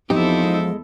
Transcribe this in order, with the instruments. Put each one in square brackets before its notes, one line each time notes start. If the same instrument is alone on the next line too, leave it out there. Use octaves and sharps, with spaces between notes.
[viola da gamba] E2 E4 A4 [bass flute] F3 [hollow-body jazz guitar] C4 G4 [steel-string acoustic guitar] D#4
[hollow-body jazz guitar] G#3